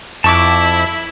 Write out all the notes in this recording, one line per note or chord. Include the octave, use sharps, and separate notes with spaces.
F2 E4 A5 C#6 D6